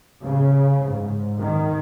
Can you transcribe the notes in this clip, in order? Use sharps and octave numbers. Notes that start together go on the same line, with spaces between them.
C#3
G#2
D#3